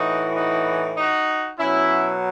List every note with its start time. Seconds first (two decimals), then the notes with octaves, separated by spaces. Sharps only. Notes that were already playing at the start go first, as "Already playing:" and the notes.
Already playing: A2 E3 D#4 F#4
0.36 D#4 F#4
0.97 D#4 F#4
1.59 B2 F#3 C#4 E4